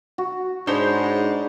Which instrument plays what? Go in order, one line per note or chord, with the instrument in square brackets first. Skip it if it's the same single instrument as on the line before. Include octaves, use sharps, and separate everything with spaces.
[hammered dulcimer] F#4
[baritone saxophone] G#2 [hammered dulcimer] D4 B5 [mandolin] C5 C#5